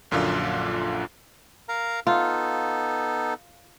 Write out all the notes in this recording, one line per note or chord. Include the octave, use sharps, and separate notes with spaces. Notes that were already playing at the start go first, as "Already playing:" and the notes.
A#1 F#2 A#2 D3 F4
A#4 F5 A#5
B3 D#4 F4 A4